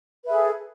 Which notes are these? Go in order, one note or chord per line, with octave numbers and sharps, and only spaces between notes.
G#4 A4 B4 E5